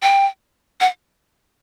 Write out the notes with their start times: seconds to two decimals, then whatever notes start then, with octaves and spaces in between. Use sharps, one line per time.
0.02 G5
0.81 F#5